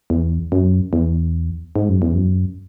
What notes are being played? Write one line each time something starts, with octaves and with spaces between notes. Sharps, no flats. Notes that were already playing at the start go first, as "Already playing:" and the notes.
E2
F#2
E2
G#2
F#2
E2
F#2